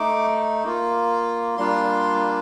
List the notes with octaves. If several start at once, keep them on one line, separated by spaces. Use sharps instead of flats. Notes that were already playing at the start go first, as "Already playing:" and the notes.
Already playing: A3 D#4 D6
A#3 F4
G3 A#3 D4 F4 C6